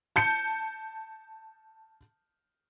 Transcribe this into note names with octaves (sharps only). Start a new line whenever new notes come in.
A5 G6 C#7